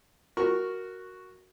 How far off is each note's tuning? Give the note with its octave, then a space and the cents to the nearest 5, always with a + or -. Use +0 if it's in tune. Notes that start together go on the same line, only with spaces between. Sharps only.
F#4 +0 A#4 +0 C#6 -10